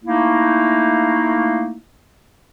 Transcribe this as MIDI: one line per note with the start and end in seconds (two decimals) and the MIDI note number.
0.04 1.77 57
0.04 1.77 58
0.04 1.77 63
0.04 1.77 64